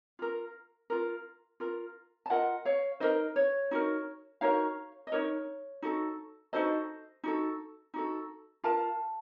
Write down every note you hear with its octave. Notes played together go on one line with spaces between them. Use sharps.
F4 A#4
F4 A#4
F4 A#4
A5
F4 A#4 D#5 F#5
C#5 F5
D#4 F#4 A#4 C5 D#5
C#5
D#4 F#4 A#4
D#4 F#4 A#4 C#5 F5
D#5
D#4 F#4 A#4 C#5
D#4 F#4 A4
D#4 F#4 A4 C5 D#5
D#4 F#4 A4
D#4 F#4 A4
F4 A#4 F5 A5